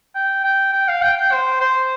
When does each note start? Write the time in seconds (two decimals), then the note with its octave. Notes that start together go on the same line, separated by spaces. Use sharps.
0.15 G5
0.44 G5
0.73 G5
0.88 F5
1.02 G5
1.17 G5
1.32 C5
1.60 C5